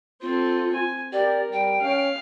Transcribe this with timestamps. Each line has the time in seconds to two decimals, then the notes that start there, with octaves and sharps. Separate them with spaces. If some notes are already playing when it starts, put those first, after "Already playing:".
0.21 C4 F4 A4
0.72 G#5
1.12 G4 A#4 D5
1.52 G3 G5
1.81 C#4 F5